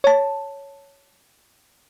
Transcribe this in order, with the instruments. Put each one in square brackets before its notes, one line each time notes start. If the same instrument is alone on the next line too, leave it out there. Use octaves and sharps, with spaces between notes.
[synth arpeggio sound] C#5 A5